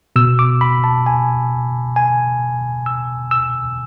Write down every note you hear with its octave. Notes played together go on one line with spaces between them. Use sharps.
B2 E6
D6
B5
A5
G#5
G#5
E6
E6